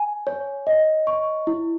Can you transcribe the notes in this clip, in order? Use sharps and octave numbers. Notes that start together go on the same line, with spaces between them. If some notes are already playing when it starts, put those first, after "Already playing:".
Already playing: G#5
C#5
D#5
C#6
E4